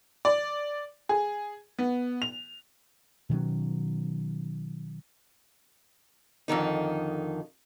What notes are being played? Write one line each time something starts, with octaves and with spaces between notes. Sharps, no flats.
D5
G#4
B3
F7
B2 D#3 F#3 C#4
F2 D3 D#3 D#4